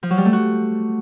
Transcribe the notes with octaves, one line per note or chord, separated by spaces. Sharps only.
F3
F#3
G3
A3
F#4